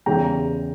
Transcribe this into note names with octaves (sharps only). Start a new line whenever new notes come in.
E2 C#3 E3 G5 A#5